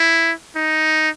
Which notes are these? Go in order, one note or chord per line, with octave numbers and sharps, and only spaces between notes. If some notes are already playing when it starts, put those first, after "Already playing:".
Already playing: E4
D#4